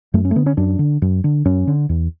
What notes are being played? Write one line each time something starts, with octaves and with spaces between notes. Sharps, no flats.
F#2 A3
C#4
A3
D3 B3
C#4
F#2 D4
D3
F#2
D3
F#2 C#4
D3
E2